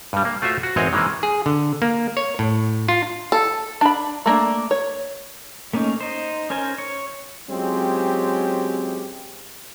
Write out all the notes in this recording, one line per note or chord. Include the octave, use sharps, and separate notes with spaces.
G2 G3
A#3
A3 F4 F#4 C5 E5
F#4
G#1 E2 G#3 C4 C#5 D#5
D#3 E3 G#3 A#3
G#4
D3
A#3
C#5
A2
F4
A4
D4 B5
A3 A#3 D4
C#5
A3 A#3 C#4 D#4
D#4 C5
C#4 A#4 C5 G#5
C#5
F#3 G#3 C4 C#4 F4 G4